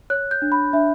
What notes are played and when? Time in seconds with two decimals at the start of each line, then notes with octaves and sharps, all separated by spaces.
0.10 C#5 F#6
0.31 G6
0.42 D4
0.52 B5
0.73 D4 E5